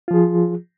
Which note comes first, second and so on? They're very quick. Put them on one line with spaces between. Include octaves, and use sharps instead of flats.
F4 F3 G#4